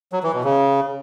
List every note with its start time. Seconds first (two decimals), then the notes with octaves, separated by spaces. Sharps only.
0.13 F#3
0.23 E3
0.34 B2
0.44 C#3